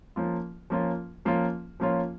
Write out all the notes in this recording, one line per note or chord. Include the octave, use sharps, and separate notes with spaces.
F3 A#3 C#4 F4
F3 A#3 C#4 F4
F3 A#3 C#4 F4
F3 A#3 C#4 F4